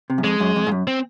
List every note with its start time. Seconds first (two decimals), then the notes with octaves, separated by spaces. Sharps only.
0.10 C3
0.18 F#2
0.24 F2 G#3
0.40 F#2
0.56 F2
0.67 G#2
0.71 F#2
0.87 C4